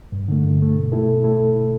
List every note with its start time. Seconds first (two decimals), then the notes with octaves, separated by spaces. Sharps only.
0.12 G2
0.28 D3 A3
0.45 G2
0.60 D3 A3
0.76 B2
0.92 A3 E4 A4
1.07 B2
1.24 A3 E4 A4